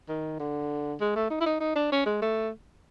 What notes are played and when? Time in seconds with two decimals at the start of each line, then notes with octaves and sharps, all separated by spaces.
0.09 D#3
0.40 D3
1.00 G#3
1.16 A3
1.31 D#4
1.41 E4
1.46 D#4
1.61 D#4
1.76 D4
1.92 C#4
2.06 G#3
2.22 A3